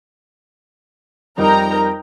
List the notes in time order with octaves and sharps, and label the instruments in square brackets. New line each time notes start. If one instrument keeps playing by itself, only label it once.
[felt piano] F2 G3 [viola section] D#4 G5 [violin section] A#4 A#5